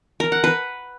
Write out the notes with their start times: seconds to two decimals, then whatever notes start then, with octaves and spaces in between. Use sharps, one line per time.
0.20 A#4
0.32 F#5
0.44 B4